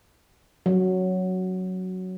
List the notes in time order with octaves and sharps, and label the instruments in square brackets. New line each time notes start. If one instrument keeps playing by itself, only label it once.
[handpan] F#3